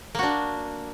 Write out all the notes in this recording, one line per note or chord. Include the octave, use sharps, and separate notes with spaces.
A#3 D4 F#4